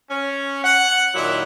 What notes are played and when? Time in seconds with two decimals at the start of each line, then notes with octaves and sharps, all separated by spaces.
0.10 C#4
0.63 F#5
1.14 A#2 D#3 F#3 E4